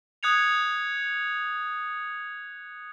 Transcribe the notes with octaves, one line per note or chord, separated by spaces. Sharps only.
D#6 F#6 G#6 C#7 F7